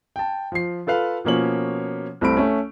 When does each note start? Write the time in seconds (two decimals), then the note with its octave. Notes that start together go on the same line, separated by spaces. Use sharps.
0.16 G5 A5
0.52 F3 C7
0.87 F4 A4 B4 F5
1.25 B2 F3 A#3 C#4 C#5 F#7
2.21 C2 A3 C4 B5 D7
2.37 A3 C#4